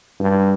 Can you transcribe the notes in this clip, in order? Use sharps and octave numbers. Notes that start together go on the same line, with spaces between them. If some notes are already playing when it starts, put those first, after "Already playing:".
G2